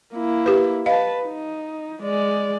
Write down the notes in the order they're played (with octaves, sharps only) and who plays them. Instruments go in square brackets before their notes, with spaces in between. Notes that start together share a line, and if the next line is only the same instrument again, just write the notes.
[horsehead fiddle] A#3 E4
[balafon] G4 B4
[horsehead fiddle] B4 A5 [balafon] D#5 F5
[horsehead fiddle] D#4
G#3 D5